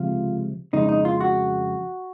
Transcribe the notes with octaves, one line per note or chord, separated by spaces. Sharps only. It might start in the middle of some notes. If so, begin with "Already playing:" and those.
Already playing: C#2 C3 F3 F4
F2 C#3 G#3 D#4
D#4
F4
F#4